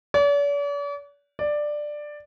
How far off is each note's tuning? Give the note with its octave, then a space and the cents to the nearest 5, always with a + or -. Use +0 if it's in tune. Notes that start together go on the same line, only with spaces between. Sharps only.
D5 -45
D5 +10